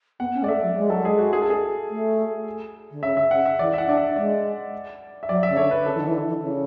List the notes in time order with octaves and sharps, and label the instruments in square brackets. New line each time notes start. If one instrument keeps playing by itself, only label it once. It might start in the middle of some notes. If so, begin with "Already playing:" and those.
[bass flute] B3 [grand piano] F#5
[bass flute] C#4
[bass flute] G#3 [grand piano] D5
[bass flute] A3 [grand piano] E5
[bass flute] F#3
[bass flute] G#3 [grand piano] D5
[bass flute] F#3 [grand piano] A4
[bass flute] G#3 [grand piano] G#4
[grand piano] F#4
G#4
A4
G#4
[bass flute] A3
D3
[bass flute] C#3 [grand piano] E5
[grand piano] E5
[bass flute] C#3 [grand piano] F#5
[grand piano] E5
[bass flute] E3 [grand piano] D5
[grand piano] E5
F#5
[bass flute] D4 [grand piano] D5
[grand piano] E5
[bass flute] G#3 [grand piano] D5
[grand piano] E5
[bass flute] F#3 [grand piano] D5
[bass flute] C#3 [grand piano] E5
[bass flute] D3 [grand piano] C#5
[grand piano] B4
[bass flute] C#3 [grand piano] A4
[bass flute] E3
D3
E3
D3
E3
C#3